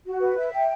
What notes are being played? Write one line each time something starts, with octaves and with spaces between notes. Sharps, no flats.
F#4
B4
E5
G5